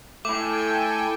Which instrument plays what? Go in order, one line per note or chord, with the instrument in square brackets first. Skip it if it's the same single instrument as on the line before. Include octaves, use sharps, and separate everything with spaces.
[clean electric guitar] A3 E4 [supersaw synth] A4 G5 G#5 [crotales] D6